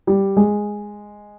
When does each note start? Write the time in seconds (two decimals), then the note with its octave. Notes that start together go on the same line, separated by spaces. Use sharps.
0.07 G3
0.37 G#3